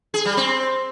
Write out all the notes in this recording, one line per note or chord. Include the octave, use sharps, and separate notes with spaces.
G#4
G3
C4